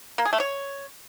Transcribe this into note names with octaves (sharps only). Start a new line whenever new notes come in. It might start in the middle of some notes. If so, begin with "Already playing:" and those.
A#3
G#4
A3
C#5